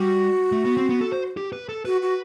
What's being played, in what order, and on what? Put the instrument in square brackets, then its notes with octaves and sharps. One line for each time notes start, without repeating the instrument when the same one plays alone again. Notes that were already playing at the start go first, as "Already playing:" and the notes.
Already playing: [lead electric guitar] G3 [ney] F#4
[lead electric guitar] A3
B3
C4
B3
A4
C5
G4
B4
A4
[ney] F#4 [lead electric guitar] B4
[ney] F#4